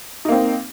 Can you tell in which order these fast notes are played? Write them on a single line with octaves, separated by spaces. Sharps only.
D#4 A#3 C4